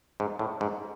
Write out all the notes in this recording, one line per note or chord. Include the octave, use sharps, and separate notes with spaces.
G#2
A2
G#2